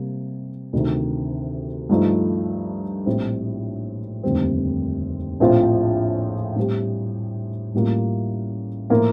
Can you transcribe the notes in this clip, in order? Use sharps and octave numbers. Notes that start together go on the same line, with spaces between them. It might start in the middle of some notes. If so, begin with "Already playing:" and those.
Already playing: C3 G3 A#3
D2 C3 D#3
G2 F3 A3 D#4
A#1 A2 G3 C4
F1 D#2 D3 G3 C4
A#1 A2 F3 C4 F4
A2 G3 C4 G4
A1 A2 G3 A#3 F4
A2 F3 A#3 F4 A#4